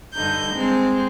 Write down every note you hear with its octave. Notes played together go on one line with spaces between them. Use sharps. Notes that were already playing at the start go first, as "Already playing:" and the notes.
G2 D3 D#4 G6
G#3 C4